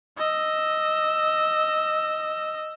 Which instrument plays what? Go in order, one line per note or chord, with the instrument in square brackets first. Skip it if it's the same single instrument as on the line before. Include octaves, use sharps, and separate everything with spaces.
[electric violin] D#5 E6